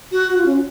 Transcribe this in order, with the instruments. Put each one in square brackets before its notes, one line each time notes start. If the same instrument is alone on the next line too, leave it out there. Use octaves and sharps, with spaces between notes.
[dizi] F#4
[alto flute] F#4
F4
C#4